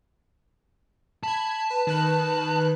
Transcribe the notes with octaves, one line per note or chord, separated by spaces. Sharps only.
A5 B5 G#6
B4
D#3 B4 F#6